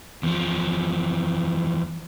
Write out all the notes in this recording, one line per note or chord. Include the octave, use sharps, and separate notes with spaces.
E2 F3